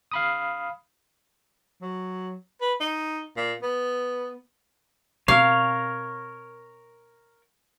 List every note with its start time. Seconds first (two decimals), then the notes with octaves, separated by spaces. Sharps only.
0.11 F5 B5 D#6
1.82 F#3
2.61 B4
2.80 D#4
3.36 A#2
3.62 B3
5.28 B2 C4 A#4 C#5 F5